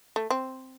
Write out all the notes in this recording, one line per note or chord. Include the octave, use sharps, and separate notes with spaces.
A3
C4